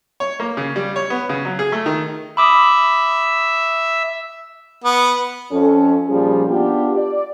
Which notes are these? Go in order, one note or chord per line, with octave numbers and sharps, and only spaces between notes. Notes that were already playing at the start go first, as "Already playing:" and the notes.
C#5
A#3
C#3
G3
C#5
B3
C#3
F#3
G#4
A3
D#3
E5 B5 D6 D#6
B3
F2 C#4 A4
A#2 F3 G3 C#4 G#4
B3 D4 F4 G4
D5